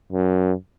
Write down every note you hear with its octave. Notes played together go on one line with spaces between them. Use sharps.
F#2